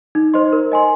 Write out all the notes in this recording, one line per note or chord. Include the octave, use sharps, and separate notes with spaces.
D#4
C5 D#5 C6
A#4
D#5 G#5 C6